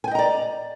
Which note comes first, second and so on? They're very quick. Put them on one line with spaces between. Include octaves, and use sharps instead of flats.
G#5 G5 D#5 A#5 D5